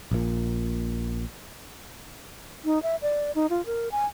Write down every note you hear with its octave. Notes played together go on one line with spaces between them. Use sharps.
A#1 A#2
D#4
E5
D5
D#4
F4
A#4
G#5